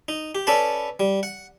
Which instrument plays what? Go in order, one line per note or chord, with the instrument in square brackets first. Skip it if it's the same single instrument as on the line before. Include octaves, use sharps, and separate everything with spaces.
[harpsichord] D#4
G4
C#4 A4 B4 D5 A5 B5
G3
F#5